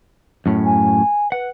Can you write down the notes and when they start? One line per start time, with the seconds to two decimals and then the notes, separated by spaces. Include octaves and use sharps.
0.46 F#2 A2 C#4
0.65 G#5
1.32 B4 F#5